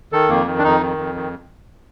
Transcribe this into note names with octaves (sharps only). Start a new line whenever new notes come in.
D#3 A4
F2 A#3
D#3
D4
F2 D#4
D#3
F2
D#3